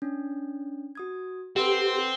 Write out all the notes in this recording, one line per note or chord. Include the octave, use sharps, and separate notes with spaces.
C#4 D4
F#4 D#6 G#6
C4 G4 A4 B4 F#5